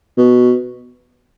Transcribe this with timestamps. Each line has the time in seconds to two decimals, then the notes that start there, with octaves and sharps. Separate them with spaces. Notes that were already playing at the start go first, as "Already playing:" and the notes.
0.17 B2